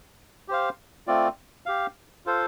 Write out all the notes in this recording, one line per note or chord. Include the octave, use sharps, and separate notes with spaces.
G4 C5 F5
A3 C4 F4 D5
G4 F5
F4 A4 C5 F5